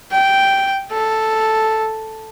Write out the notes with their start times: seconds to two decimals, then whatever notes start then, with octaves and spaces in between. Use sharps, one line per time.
0.12 G5
0.92 A4